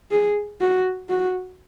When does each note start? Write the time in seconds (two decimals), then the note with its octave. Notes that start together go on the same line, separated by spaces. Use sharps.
0.11 G#4
0.61 F#4
1.09 F#4